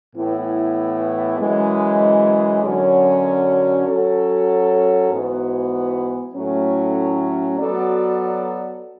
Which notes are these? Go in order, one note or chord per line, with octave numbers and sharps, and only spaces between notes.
A2 E3 B3 E4
F#2 E3 G#3
F#2 D3 F#3 C#4
F#3 C#4 F#4 A4
G#2 E3 B3 F#4
A2 F#3 A3 C#4
F#3 B3 F#4 A4 D5